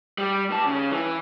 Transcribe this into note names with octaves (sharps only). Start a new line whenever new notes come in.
G3
G2 A5
C#3 C#4
E3